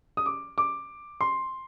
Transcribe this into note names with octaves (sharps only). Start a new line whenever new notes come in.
D#6
D6
D6
C6